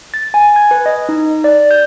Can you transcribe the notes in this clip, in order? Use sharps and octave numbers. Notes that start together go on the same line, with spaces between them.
A6
G#5
G#6
B4
D#5
D#4
D5
G6